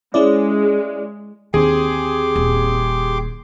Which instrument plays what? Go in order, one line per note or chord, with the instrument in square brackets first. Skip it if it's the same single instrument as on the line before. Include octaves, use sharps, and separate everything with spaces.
[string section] G#3 [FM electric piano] C#4 E4 D5
[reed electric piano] D#2 C4 [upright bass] D3 [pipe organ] G4 C6 D6 [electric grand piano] G#4
[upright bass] D#1